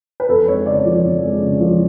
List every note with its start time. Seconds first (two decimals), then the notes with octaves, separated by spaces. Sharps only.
0.20 B4
0.29 F2 A4
0.47 G#3 C#5
0.66 C#3 D5
0.86 F3
1.04 F2
1.23 G#3
1.42 C#3
1.60 F3